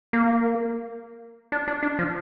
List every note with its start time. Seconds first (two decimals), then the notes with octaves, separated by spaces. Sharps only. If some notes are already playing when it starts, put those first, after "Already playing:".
0.13 A#3
1.52 D4
1.68 D4
1.83 D4
1.99 F3